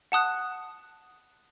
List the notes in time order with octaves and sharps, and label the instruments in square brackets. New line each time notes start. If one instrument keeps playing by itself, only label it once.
[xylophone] F#5 A5 D#6 F#6